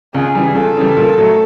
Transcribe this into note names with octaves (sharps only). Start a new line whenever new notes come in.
C#2 G#4
C#3 E3 G3
C#2 A4
C#3 E3 G3
A#2
F#3 A3